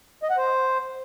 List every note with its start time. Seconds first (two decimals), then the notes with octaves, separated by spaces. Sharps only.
0.23 D#5
0.30 F#5
0.37 C5